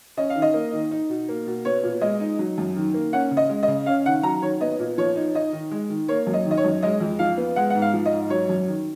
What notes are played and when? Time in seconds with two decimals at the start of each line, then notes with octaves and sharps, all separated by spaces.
0.17 C#4 D#5
0.30 F5
0.36 D#3
0.42 D#5
0.54 A#3
0.73 D#3
0.91 D#4
1.09 B2
1.29 A#3
1.46 B2
1.65 B3 C#5
1.83 A#2
2.01 G#3 D#5
2.20 D#4
2.39 F#3
2.58 F#2
2.76 D#3
2.94 A#3
3.13 C#4 F#5
3.31 C#3
3.37 D#5
3.49 G#3
3.63 D#5
3.68 C#3
3.86 C#4 F5
4.06 D#3 F#5
4.23 F#3 A#5
4.42 D#3 C#5
4.61 B3 D#5
4.79 A#2
4.98 F3 C#5
5.16 D#4
5.35 D#4 D#5
5.53 D#3
5.71 G#3
5.90 D#3
6.08 A#3 C#5
6.27 F#2
6.34 D#5
6.45 D#3
6.51 D#5
6.57 C#5
6.64 F#2
6.83 G#3 D#5
7.00 F2
7.19 F3 F5
7.37 B3
7.56 G#3 F#5
7.70 G#2 F#5
7.82 F5
7.94 F3
8.06 D#5
8.13 G#2
8.30 F#3 C#5
8.49 F#2
8.67 D#3